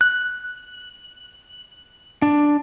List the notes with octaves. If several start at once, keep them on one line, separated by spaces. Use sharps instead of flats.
F#6
D4